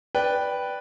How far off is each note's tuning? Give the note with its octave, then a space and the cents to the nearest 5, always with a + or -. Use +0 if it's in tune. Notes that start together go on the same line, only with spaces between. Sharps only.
B4 +0 D5 +0 G5 +0